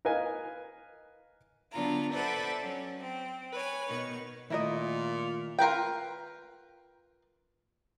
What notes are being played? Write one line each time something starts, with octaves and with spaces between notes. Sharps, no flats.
A#4 B4 D#5 F5 G#5
D3 F#3 B3 D4 F4 A#5
A4 B4 C5 D5 E5 F#5
F#3 C#4
C4
B4 C#5 G#5
B2 D#3 C#6
A#2 D#3 A3 E4 F4 A#4 D#5
F4 A#4 B4 G5